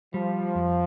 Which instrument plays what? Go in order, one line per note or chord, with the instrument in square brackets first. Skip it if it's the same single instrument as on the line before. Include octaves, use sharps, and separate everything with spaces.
[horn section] F3 [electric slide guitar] G3
[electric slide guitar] F2